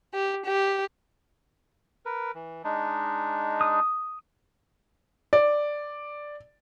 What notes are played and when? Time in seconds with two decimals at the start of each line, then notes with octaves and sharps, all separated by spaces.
0.13 G4
0.46 G4
2.05 A#4 B4
2.35 E3
2.64 G#3 D4 D#4
3.61 D#6
5.33 D5